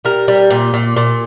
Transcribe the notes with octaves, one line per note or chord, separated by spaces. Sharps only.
G3 A#4
G3
A#2
A#2
A#2